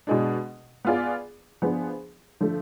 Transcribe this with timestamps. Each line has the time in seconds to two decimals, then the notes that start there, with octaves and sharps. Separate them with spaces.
0.07 B2 G#3 D4
0.85 B3 F4 G#4 D5
1.62 F3 B3 D4 G#4 C5
2.41 D3 F3 A3